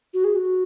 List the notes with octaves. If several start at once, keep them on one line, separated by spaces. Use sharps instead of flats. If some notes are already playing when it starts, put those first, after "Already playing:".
F#4
G#4
F#4